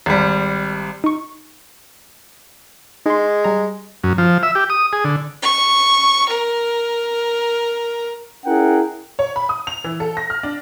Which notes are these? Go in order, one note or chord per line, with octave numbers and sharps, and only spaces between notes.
G#1 G3
D#4 C#6
G#3 D#4 C6
G3 A#5
F#2
F3
E5
G4
D#6
G#4
D3
C#6
A#4
C#4 E4 G#4 A#4 F#5 G5
C#5
B5
D#6
F7
E3
A4
A#6
F6
D4